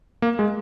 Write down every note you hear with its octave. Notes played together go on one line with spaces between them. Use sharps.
A#3
G#3